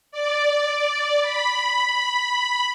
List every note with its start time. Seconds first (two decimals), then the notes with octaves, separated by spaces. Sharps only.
0.12 D5
1.22 B5